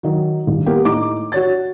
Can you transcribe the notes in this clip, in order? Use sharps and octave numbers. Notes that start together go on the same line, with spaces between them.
D#3 F#3
D#1
A#3 B3 G4
A2 D#4 D6
F#4 C#5 A6